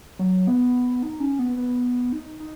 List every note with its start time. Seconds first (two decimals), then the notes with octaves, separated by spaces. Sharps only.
0.19 F#3
0.47 B3
1.03 D#4
1.20 C#4
1.39 B3
1.57 B3
2.12 D#4
2.40 D#4